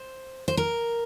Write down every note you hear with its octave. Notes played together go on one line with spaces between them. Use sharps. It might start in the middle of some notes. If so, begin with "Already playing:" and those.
Already playing: C5
C5
A#4